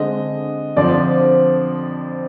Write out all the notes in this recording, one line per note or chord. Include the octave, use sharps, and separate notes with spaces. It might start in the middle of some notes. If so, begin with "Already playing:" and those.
Already playing: D3 G#3 C4 D#5
F2 D3 F3 C4 D5